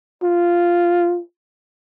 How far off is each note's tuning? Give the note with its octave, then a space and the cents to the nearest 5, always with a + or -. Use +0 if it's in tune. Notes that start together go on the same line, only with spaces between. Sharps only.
F4 -5